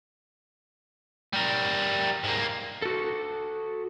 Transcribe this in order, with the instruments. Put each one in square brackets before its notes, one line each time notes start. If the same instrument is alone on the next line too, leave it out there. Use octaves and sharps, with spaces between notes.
[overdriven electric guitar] G3 A#4
G#2 A#3
[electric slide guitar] F#4 A4